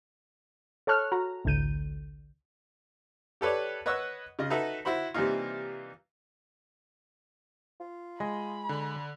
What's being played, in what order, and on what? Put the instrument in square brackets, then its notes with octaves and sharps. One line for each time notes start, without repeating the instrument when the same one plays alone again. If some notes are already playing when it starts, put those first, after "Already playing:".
[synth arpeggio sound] A4 C#5 A5 C#6 F6 F#6
F#4 A#5
A1 D2 D3 G6 D#7
[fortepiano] G4 A4 B4 C#5 D5
B4 C#5 D#5 F#5 C#6 E6
C#3 F4 D#5
D#4 F#4 A4 B4 E5 A#5
E4 F#4 C5 B5
C3 E3 G3 A#3 D#4 F4
[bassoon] F4
[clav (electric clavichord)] G#3 [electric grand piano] D#5 [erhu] B5
[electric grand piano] D3